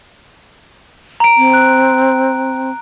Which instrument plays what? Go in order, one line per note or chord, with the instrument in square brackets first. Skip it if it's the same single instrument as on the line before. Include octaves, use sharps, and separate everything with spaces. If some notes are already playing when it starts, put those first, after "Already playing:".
[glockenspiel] A#5 D7
[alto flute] C4
[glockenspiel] F#6